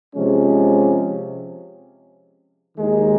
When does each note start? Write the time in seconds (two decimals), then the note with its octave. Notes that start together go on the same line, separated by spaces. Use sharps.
0.14 C3 F3 G#3 C#4
2.76 D#2 D#3 G#3 D#4